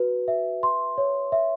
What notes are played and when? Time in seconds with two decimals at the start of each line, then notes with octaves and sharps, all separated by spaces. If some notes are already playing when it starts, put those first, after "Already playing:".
Already playing: F#4 B4
0.28 E5
0.63 C6
0.98 C#5
1.32 E5